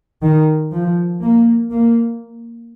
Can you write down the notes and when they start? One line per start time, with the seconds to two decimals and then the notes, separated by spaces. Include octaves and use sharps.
0.23 D#3
0.72 F3
1.21 A#3
1.71 A#3